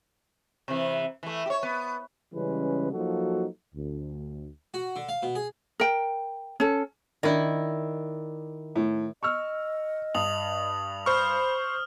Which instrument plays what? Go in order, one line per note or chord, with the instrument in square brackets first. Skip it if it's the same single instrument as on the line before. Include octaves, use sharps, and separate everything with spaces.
[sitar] C3 E3
E3 A3
G4 C#5
B3
[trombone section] C#3 E3 G3 G#3 C#4 B4
F3 F#3 A#3 D#4 F#4 A4
D2
[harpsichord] F#4
D3
F5
B2
G#4
[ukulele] A#4 G5
C#4 A4
[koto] D#3 E4 [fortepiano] D4
[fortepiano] A2
[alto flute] D#5 [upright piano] C#6 E6 F6
[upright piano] G2 [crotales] D#6 F7 F#7
[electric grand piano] C5 C#6 [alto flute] B5 [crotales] F6